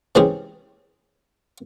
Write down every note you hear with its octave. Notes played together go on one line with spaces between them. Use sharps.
C3 E3 G#3 C#4 G4 G#4